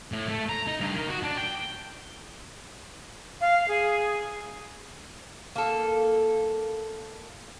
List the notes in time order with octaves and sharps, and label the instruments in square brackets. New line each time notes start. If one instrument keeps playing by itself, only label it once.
[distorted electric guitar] A2
A3
A#5
D#4
G2
D#3
F#4
D4
G5
[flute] F5
G#4
[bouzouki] A#3 A4